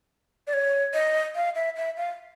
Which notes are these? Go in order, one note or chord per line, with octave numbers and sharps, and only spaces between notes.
D5
C#5
D#5
F5
E5
E5
F5